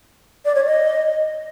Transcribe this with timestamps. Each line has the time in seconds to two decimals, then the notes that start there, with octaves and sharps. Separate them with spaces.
0.45 D5
0.55 C#5
0.65 D#5